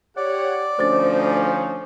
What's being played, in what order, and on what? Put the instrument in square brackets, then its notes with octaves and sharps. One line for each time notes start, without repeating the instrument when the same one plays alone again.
[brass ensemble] G4 C#5 F#5 [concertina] D5
[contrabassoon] D2 [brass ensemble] F3 C#4 D#4 [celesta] C5 D6 A6